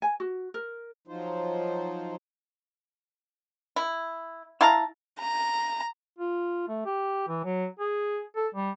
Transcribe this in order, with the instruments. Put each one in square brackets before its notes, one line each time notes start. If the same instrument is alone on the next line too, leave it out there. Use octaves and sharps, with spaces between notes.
[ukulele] G#5
F#4
A#4
[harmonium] F3 F#3 D#4 F4 C5
[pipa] E4
E4 F5 A5 A#5
[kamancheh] A#5
[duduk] F4
A3
G4
E3
F#3
G#4
A4
G3